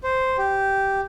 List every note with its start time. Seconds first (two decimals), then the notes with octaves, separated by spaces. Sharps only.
0.04 C5
0.38 G4